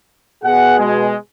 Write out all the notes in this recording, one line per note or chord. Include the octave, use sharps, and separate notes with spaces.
B2 G#4 F#5
G#3